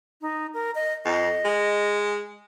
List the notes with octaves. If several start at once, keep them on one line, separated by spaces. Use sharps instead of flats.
D#4
A#4
D#5
F2 D#5
G#3